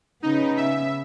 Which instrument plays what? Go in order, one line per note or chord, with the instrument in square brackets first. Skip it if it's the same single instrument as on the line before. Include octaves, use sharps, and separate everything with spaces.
[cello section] C#3 B3 [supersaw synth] D#4
[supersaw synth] E5